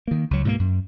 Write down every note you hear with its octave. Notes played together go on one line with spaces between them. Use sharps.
D#3 A#3
C#2 F#3
G#2 B2 G#3 A#3
F#2